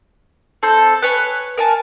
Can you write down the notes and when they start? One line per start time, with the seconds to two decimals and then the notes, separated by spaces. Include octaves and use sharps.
0.63 C4 A4 G6
1.02 B4 C#5 G#5
1.58 A#4 G#5 A5